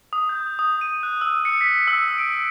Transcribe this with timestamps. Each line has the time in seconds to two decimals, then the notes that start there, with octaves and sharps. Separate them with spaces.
0.13 D#6
0.29 G6
0.59 D#6
0.81 D#7
1.03 F#6
1.21 E6
1.45 C#7
1.61 B6
1.88 E6
2.18 D7